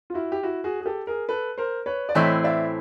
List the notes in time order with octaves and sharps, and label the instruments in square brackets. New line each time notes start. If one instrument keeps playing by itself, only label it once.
[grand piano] F4
E4 F#4
G4
E4 F#4
F#4 G#4
G#4
G4 A4
G#4 A#4
A4 B4
A#4 C5
B4 C#5
D5
[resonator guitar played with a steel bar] A2 E3 A3 C4 E4 [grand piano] C#5 D#5
[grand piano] D5 E5